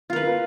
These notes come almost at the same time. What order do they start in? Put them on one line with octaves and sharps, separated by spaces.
F4 A#4 B4